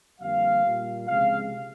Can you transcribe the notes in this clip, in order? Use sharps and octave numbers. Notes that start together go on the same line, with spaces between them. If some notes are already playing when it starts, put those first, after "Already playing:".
F2 D3 G3 A#3 F5
A#2 G3 A#3
C#2 C3 F3 G#3 F5